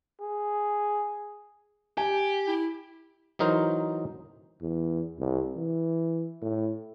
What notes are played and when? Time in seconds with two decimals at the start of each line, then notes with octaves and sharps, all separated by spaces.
0.21 G#4
1.97 G4 G#5
2.48 E4
3.39 E3 F#3 D#4 A#4 C5
4.61 E2
5.19 C2
5.57 E3
6.42 A2